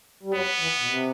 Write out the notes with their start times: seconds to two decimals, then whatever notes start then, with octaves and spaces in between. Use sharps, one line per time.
0.23 G3
0.33 F#2 F#3 B3
0.60 E2 E3
0.80 B2
0.87 C3